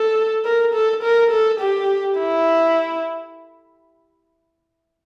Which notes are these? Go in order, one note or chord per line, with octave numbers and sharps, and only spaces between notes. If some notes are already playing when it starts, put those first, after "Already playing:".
Already playing: A4
A#4
A4
A#4
A4
G4
E4